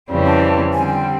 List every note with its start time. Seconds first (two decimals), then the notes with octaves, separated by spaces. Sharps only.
0.11 F2 C#3 E3 G3 C4
0.26 A5
0.73 D3 G3 C4 G#5
0.88 G5